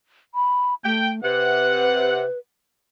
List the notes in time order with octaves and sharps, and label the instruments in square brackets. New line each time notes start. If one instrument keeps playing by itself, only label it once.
[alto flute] B5
[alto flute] A3 [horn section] G5
[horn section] C3 F#5 [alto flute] B4